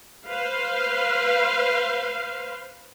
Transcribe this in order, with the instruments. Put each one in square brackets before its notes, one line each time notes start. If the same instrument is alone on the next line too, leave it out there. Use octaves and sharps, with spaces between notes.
[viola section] B4 C5 F5